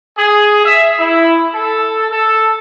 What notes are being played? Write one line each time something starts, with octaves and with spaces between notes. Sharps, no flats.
G#4
E5
E4
A4
A4